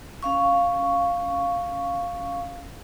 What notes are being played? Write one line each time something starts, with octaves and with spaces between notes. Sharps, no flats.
C#4 F5 C#6